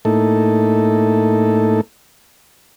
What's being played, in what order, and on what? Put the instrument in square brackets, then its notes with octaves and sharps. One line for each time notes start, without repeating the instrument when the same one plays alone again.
[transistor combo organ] A2 A3 A#3 D#4 E4 A4